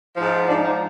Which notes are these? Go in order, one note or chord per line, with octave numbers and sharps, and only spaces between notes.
G#2 F3
G#2 F3 D4
D#4